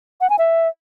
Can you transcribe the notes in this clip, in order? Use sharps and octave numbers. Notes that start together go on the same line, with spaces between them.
F#5
G#5
E5